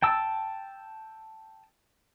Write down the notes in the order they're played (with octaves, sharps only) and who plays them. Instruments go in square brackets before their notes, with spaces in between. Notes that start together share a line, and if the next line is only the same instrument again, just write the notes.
[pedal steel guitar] G5 A5 E6